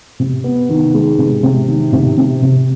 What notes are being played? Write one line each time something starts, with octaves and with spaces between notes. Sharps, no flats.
C3
B3
D#3
G#3
C3
C3
D#3
C3
C3
C3